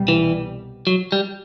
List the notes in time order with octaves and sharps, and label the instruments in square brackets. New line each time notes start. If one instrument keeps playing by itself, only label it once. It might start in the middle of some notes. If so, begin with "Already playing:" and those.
Already playing: [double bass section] C2 B2 G3
[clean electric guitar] E3
F#3
G3